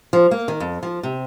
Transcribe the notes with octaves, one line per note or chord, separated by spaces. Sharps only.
F3
A#3
D#3
F2
F3
C3